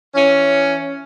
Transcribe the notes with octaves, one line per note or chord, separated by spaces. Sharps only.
E3 C#4